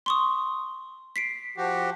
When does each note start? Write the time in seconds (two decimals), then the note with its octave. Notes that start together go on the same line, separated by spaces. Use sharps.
0.06 C6 C#6 D#6
1.16 B6 C7 D7
1.57 F3 F#4 G4